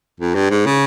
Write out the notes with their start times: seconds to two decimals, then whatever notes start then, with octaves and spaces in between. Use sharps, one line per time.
0.20 F2
0.35 G2
0.50 G#2
0.66 C#3